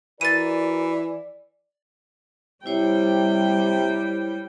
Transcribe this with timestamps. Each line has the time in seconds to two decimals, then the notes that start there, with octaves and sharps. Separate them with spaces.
0.21 E3 F#4 A#4 D5 A6 D#7
2.66 C3 G3 E4 C5 C#5 G5